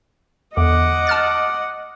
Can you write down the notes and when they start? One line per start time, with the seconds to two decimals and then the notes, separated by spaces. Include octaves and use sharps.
0.57 E2 D3 D#5 F#5 D6
1.07 A5 F6 A6